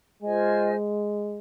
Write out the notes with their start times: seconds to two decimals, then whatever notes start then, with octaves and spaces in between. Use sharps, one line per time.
0.22 G#3 F4 C5 D#5 G#5